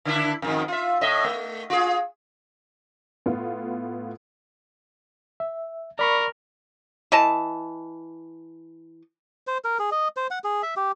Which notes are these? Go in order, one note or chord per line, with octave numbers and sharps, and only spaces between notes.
D3 D4 E4
F2 G#2 D#3
F4 E5
A2 D#5 E5
A3
F4 G#4
A2 B3 F4
E5
A#4 D5 B5 C#6
E3 D#5 A5
C5
A#4
G#4
D#5
C5
F#5
G#4
E5
G4